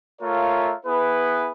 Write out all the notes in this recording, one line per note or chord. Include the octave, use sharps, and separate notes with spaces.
A3 F4 A#4 C#5 E5 F5
B3 E4 G#4 B4